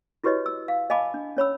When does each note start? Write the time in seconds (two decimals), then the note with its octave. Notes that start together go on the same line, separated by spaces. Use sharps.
0.24 E4 F#4 G4 B4 C#5 D#5
0.46 E6
0.68 F5
0.90 D#5 F5 G#5 A5 B5 D6
1.14 D4
1.37 C#4 C#5 B5 E6